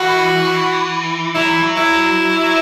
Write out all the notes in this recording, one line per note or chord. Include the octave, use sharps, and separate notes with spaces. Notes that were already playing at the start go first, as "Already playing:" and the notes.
Already playing: E3 F#4
F#3 E4
E3
F#3
E4